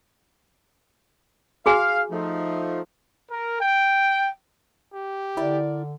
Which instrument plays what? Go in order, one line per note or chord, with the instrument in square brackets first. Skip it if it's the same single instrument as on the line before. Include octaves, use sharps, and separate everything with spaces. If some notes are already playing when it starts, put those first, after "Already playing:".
[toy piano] F#4 G#4 G#5 [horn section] F5
[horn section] F3 A3 D#4
[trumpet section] A#4
G5
[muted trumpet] G4
[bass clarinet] D3 [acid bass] E4 [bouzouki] A#4 D5